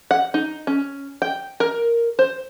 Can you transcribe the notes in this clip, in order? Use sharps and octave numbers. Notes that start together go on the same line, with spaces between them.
F#5
D#4
C#4
G5
A#4
C5